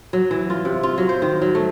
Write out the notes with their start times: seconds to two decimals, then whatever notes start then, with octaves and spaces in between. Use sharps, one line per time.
0.13 F#3
0.31 E3
0.50 F4
0.65 C3
0.83 F4
0.98 F#3
1.09 C5
1.22 D#3
1.42 F#3
1.55 A3